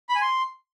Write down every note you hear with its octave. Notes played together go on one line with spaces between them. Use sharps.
B5
G#5
C6